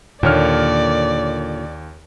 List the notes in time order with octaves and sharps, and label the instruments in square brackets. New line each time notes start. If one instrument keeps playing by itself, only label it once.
[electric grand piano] D#2 C#5 F6 [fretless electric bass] A#2 D3 [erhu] D5